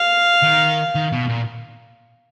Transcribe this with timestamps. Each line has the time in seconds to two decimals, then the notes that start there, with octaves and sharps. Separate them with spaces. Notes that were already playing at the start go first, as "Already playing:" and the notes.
Already playing: F5
0.43 D#3
0.95 D#3
1.12 B2
1.29 A#2